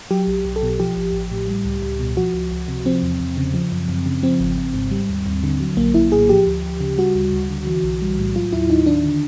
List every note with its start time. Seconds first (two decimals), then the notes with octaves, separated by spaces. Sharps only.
0.11 F#3 G4
0.27 B1
0.45 B1
0.56 A4
0.62 B2
0.80 F3 G4
0.96 A1
1.13 A1
1.31 A2
1.48 G3
1.65 C#2
1.82 C#2
1.99 B2
2.17 F3 F#4
2.34 C#2
2.51 C#2
2.68 C3
2.85 F3 C4
3.03 E2
3.20 E2
3.37 C#3
3.54 F3
3.72 F#2
3.88 F#2
4.06 C#3
4.23 F3 C4
4.40 G#1
4.58 G#1
4.74 G#2
4.91 G3
5.09 D#2
5.26 D#2
5.44 D3
5.60 F#3
5.77 A#1 A#3
5.94 A#1 E4
6.11 A2 G#4
6.29 F3 G4
6.46 D2
6.64 D2
6.81 C#3
6.98 G3 F#4
7.15 D2
7.33 D2
7.50 D3
7.67 E3
7.84 B1
8.02 G3
8.18 A2
8.36 F#3 F4
8.53 D#2 E4
8.69 D#2 D#4
8.86 D#3 D4
9.04 D3